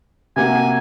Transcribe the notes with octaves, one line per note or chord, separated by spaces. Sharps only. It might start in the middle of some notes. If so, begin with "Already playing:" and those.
C3 A#3 F#4 G#5